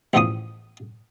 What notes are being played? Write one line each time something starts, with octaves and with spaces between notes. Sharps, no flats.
A1 E2 D3 F3 C#6 D#6